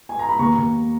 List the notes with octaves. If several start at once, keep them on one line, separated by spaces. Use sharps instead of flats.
G#5
A#5
B5
D#2 A#5 C#6
D#2